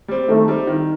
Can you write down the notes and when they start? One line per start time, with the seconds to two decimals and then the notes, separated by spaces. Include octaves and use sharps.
0.08 G3 C4
0.28 D#3 A3
0.48 G3 C4
0.67 D#3